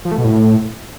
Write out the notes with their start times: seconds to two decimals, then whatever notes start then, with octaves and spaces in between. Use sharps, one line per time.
0.05 F3
0.11 A3
0.18 B2
0.24 A2